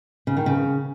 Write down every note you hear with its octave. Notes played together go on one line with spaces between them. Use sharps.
C#3
D#3
C#3